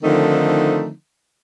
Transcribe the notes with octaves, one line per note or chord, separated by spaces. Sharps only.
D3 D#3 F3 A3 C4 D#4